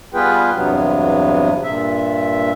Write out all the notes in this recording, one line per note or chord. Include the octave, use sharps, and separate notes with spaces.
G3 B3 F4 G#4 B4 G5
E2 G2 C3 F#3 B3
G2 A#2 E5